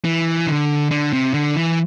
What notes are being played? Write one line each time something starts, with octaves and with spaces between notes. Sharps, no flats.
E3
D3
D3
C3
D3
E3